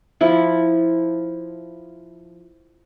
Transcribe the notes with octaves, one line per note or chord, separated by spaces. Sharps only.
F3 E4